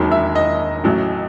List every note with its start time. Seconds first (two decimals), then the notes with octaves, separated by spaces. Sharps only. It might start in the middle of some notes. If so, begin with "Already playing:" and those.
Already playing: E1 D#2 D#3 F#3
0.11 E5
0.35 D#5
0.84 A1 A2 F#3